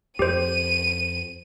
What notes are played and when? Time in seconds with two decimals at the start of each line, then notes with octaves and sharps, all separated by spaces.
0.19 F2 G4 C5 D#7